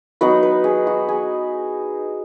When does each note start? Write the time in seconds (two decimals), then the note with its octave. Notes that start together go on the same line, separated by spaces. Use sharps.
0.21 F#3 B3 D#4 B4
0.43 B4
0.64 G#4
0.87 F#4
1.09 G#4